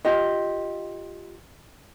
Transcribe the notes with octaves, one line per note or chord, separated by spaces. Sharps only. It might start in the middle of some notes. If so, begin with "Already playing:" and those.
F4 G4 D#5